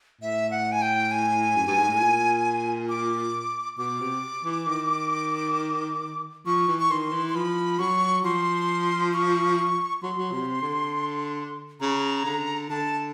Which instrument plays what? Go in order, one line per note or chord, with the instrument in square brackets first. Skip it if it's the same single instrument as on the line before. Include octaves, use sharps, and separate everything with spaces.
[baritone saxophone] A2 [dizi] E5
[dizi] F#5
G#5
G5
G#5
[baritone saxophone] F#2
G2
G#2
A2
A#2
[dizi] D6
[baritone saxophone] B2 [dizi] D6
[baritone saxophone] C3
E3
D#3
[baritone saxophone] F3 [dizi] C#6
[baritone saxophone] E3
[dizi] C#6
[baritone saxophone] D#3 [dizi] C6
[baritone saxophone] E3
[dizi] C6
[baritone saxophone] F3 [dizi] B5
[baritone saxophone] F#3 [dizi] C#6
[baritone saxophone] F3 [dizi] C6
[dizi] C#6
[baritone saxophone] F#3 [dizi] C6
[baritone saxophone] F#3
C3
D3
[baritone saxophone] C#3 [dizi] A#5
[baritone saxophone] D3
[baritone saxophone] D3 [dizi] A5